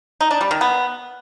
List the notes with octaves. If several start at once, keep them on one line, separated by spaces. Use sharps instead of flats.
D#4
D4
G3
D#3
B3